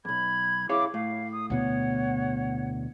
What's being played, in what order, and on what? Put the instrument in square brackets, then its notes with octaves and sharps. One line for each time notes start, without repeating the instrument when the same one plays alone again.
[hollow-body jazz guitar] B1 F2 [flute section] B5 G#6
[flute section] E4 D6 [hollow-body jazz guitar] G#4 C#5 F5
[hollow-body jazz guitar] A2 [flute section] F5
[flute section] D#6
[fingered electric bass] D2 B2 B3 [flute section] C#5 F#5